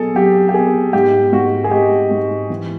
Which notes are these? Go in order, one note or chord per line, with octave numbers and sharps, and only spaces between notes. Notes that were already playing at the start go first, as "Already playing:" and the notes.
Already playing: B2 F#3 G#4 A4
F#3 G4
G4
B2 G#4
G#2 G4
G#2 F#4
G#4
G#3 G4
G#2
E3